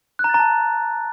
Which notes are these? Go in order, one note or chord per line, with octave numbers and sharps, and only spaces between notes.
F#6
A#5
A6
A#5
A5